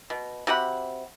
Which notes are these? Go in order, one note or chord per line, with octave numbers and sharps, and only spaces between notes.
B2
C3 F#4 F#5 B5